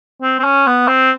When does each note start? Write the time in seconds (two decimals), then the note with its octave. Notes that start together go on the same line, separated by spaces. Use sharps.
0.22 C4
0.39 C4
0.44 C#4
0.67 B3
0.88 C4